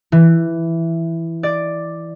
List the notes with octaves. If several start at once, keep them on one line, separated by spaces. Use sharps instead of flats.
E3
D5